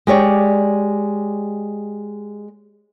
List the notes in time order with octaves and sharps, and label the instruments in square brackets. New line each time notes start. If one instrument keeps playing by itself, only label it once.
[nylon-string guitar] G#3 G4 C#5 D5